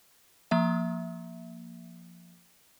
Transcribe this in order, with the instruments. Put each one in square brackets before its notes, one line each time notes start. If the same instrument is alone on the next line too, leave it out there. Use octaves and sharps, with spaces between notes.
[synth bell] F3 A#3 E5